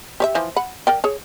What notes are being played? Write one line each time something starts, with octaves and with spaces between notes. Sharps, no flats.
G4 C#5 E5
E3 F3 C5
F#5 B5
A#4 D5 G5
G#4 C#5